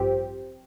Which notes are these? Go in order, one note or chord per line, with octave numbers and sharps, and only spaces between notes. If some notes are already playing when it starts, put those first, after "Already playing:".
Already playing: A1 G2 F3 C4 G4